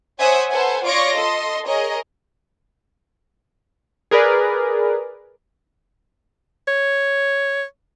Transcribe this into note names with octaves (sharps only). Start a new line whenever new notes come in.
C5 C#5 E5 F#5 G#5 D#6
A4 B4 C5 F#5 G#5
F4 C#5 D5 C#6 A#6 D7
A4 D#5 C6
G#4 A#4 C#5 D#5
G#4 A#4 B4 D5
C#5